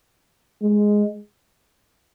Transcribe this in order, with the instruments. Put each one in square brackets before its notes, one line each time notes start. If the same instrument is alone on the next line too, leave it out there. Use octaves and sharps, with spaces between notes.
[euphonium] G#3